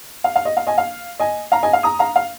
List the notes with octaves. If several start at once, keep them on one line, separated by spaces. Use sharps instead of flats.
F5
F5
D#5
F5
D#5 G#5
F5
D#5 G#5
F5 A#5
D#5 G#5
F5
A#5 D#6
F5 A#5
F5